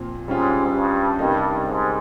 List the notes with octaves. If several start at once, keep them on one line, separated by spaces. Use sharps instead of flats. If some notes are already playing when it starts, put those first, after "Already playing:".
Already playing: A#2 F3 C4 F4
G#2 G3 C#4 F4
G2
G2 C3 G3 A#3 D#4
G#2